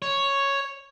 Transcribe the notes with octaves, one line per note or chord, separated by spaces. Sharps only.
C#5